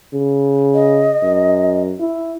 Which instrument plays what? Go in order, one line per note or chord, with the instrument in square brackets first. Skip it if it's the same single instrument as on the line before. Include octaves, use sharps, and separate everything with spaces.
[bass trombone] C#3
[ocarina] D#5
[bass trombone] F#2
E4